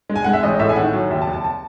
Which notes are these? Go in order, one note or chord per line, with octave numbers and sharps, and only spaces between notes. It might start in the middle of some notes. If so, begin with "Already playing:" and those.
G#3
G#5
G#3 F#5
E5
A1 D#5
A2 E5
G#5
D#3 F#5
F#3
D#2 E5
A5
D#2
A5
A5